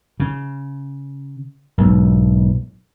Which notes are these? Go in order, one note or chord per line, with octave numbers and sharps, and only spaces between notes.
C#3
B1 G#2 B2